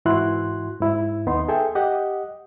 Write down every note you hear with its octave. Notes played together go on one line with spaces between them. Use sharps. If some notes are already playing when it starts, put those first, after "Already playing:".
G#2 E3 E4 F#4 C6 F#6
G#2 E4
D#2 B3 D#4 C6
G#4 A4 E5 G5
G4 D#5 F#5